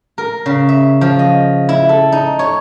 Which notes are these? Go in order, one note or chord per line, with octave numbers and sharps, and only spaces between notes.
A#4
C#3
E5
F3
D#5
E4
A4
D#4
C#5